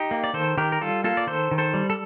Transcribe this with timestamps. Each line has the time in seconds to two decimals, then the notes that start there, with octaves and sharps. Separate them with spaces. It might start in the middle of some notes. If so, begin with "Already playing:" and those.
Already playing: D#4 G4
0.11 A#3
0.24 D5
0.34 D#3 A4 C5
0.57 D#3 G4 A#4
0.72 A#4
0.81 G3 F4 A4
1.04 A#3 F4 A4
1.17 D5
1.27 D#3 A4 C5
1.51 D#3
1.58 A4 C5
1.74 G3
1.90 A4